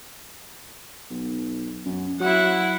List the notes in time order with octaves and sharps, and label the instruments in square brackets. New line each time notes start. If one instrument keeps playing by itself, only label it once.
[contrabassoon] B1
F#2
[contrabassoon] F#3 [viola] E4 F#5